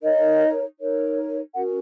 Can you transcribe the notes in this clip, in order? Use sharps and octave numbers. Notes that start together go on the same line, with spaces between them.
D#4 A#4 C#5 D#5
D#4 A#4 C#5
C#4 F#4 A#4 F#5